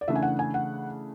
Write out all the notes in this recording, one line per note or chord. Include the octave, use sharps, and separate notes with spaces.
D5
C#3 E3 A3 D4 E5
G#5
F#5
G#5
F#5